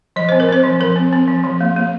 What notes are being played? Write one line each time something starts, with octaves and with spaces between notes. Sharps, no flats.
F3 D#5
C4 C5
A#4
C4 C5
F3
F3 A#4
C4
C4
F3
F3
A#3
A#3